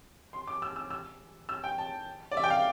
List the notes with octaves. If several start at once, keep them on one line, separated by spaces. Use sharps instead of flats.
C6
D6
E6
E6
E6
E6
G5
A5
D5
E5
G5
F5